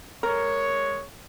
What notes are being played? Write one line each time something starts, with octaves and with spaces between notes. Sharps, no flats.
G#3 A#4 C#5